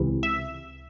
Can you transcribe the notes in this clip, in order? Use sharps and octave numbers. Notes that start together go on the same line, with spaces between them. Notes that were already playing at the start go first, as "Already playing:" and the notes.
Already playing: C#2 C3 E3
E5